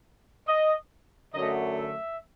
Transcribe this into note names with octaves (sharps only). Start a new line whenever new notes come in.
D#5
F#2 D3 F#3 A3 D#5
E5